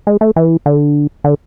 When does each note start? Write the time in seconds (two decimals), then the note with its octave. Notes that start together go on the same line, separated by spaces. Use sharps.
0.07 G#3
0.21 A3
0.36 E3
0.66 D3
1.24 D3